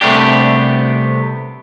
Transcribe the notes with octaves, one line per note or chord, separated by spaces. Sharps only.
C2 C3 A3 B3 D4 G4